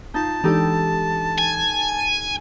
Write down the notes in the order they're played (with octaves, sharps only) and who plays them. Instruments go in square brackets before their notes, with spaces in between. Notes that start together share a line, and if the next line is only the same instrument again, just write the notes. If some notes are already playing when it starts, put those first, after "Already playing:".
[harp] D#4 [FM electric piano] F4 G6 [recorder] A5
[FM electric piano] E3 G#3 D4 [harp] D#4 G4 A4
[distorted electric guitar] G#5